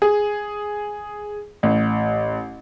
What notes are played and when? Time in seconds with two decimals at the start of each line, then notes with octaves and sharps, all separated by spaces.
0.02 G#4
1.63 A1